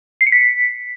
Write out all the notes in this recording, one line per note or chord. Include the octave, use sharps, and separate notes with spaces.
C7
C#7
B6